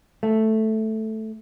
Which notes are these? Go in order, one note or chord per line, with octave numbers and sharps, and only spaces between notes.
A3